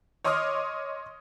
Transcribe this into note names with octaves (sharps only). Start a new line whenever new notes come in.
C#5 D#5 C6 D6 D#6 F6